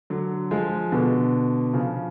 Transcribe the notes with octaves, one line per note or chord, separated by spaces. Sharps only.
D3 F#3
F3 G#3
B2 D3
C#3 F3